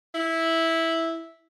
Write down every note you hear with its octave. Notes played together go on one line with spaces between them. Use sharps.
E4